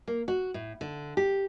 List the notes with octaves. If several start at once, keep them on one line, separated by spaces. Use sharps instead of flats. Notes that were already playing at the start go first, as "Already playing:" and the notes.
A#3
F#4
A2
D3
G4